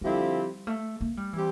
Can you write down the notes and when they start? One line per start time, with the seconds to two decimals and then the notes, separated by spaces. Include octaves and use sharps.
0.01 D3 F3 G3 C4 E4 G4
0.67 A3
1.01 A#3
1.17 G3
1.33 E3 G3 C4 G4